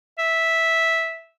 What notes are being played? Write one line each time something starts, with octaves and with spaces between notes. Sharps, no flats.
E5